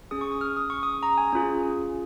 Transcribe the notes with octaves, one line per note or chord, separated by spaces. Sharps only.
C#4 G#4 D#6
C#6
D#6
F6
D#6
C#6
D#6
A#5
G#5
C#4 F4 G#4